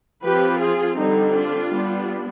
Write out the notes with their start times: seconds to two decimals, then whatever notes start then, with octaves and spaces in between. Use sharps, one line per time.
0.23 F3 C4 G4 B4
0.59 F4 G#4
0.96 D3 G3 C4 D#4
1.32 D4 F4
1.69 G3 B3 D4